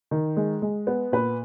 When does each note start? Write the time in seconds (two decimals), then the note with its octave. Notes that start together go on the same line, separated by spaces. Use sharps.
0.11 D#3
0.37 G#3
0.62 G#3
0.87 B3
1.12 A#2 B4